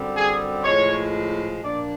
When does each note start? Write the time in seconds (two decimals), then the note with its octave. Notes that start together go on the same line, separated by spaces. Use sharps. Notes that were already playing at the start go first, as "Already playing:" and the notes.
Already playing: F#2 D3 G3 C4
0.15 G#4
0.64 A2 F3 G#3 C#5
1.63 A#2 F3 A#3 D4 D5